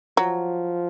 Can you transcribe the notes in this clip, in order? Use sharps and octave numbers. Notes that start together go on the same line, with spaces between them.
F3 F#3